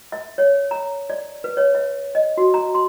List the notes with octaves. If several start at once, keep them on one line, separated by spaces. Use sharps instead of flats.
E5
C#5
A#5
D5
B4
C#5
E5
D#5
F#4
A#5
C6